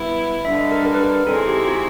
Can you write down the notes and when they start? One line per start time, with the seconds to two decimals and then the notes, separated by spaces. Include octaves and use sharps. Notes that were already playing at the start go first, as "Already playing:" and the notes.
Already playing: G3 B3 E4
0.44 G2 D3 G3 E5
0.58 D#5
0.72 A#4
0.86 A#4
0.94 B4
1.03 A#4
1.27 D#3 G#3 C4 E4 G#4 A4
1.47 G4
1.68 F#4